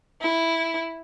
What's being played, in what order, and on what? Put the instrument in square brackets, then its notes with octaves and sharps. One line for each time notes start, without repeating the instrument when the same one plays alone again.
[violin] E4